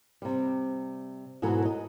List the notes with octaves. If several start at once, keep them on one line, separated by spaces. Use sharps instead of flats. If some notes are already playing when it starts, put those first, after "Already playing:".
C3 G3
G#2 B2 E3 F#3 F#4 A4
D#5